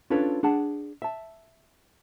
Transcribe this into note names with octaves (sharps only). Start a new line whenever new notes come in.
C#4 D4 F4 A4 B4 C#5
D4 G#4 F#5 A5
E5 A5